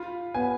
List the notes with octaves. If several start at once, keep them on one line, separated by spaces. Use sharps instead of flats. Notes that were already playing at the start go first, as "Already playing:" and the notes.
Already playing: F4 B5
B3 G#5